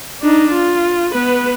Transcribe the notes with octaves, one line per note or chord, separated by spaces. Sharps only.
D4 D#4
F4
B3 B4